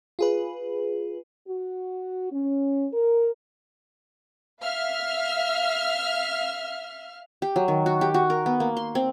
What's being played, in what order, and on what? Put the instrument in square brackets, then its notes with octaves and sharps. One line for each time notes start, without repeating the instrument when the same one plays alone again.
[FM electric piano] F4 G#4 B4
[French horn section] F#4
C#4
A#4
[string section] E5 F5 F6
[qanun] G4
F#3
D#3
F#4
G4
F#4
A#4
B3
A#3
C6
C4